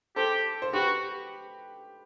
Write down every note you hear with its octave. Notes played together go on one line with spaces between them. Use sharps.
G4 A4 C5
C5
F#4 G4 B4